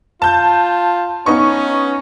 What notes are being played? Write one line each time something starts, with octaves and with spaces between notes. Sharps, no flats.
F4 A5 G6
B3 C#4 D#4 C#6